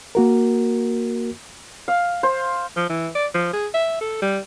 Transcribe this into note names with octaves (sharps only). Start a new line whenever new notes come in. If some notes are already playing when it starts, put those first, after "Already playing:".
A#3 F#4 A#4
F5
C5
F3
E3
D5
F3
G#4
E5
A4
G3